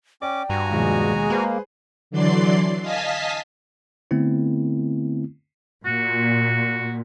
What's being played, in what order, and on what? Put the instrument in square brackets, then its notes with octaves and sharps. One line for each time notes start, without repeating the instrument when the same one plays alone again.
[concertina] C#4 D6 [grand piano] D5 [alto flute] G5
[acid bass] G2 [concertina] F#4 G#5 A#5
[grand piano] D#2 B2 F3 [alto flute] G#3
[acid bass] A#3 [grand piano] G#4 B4 C5
[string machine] D3 E3 F#3 D5 C6 C7
D#5 F5 G#5 A5 B6
[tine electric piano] D3 A3 B3 C4 E4
[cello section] A#2 [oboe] F#4